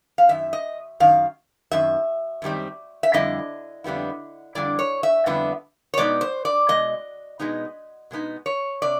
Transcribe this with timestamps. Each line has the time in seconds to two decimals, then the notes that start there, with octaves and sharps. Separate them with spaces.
0.18 F5
0.29 F#2 D#3 E5
0.53 D#5
1.00 F#2 D#3 F5
1.72 F#2 D#3 E5
2.42 F#2 D#3 G3 C4
3.03 E5
3.13 F2 D3 G3 E4 D#5
3.84 F2 D3 G3 B3 E4
4.55 F2 D3 G3 E4 D5
4.79 C#5
5.03 E5
5.26 F2 D3 G3 B3 E4
5.94 C#5
5.97 B2 G#3 B3 D#4 D5
6.21 C5
6.45 D5
6.69 B2 G#3 D#5
7.39 B2 G#3 B3 D#4
8.11 B2 G#3 B3 D#4
8.46 C#5
8.82 C3 D5